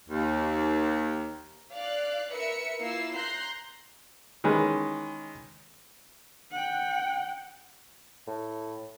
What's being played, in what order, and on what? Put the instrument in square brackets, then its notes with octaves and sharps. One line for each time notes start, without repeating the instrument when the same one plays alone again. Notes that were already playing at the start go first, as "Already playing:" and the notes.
[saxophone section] D#2
[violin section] D5 F5 F#6
A#4 B4 E5 C#7
A#3 E4 F4 E6 C7
A#5 C6 F#6 G6 C7
[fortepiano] D#3 E3 G#3 C#4 B4
[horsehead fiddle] F#5 G5
[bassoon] A2